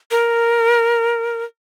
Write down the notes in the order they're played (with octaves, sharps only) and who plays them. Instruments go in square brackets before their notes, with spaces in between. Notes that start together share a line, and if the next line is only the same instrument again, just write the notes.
[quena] A#4